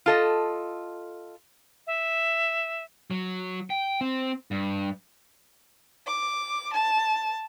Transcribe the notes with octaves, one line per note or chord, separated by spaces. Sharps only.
F4 A4 D#5
E5
F#3
G5
C4
G2
D6
A5